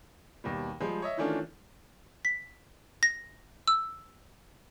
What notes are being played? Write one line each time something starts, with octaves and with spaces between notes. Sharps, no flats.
D#2 B2 G3
F3 G3 G#3
C#5 D#5 E5
D#3 E3 A3 C#4 D4 F4
B6
A#6
E6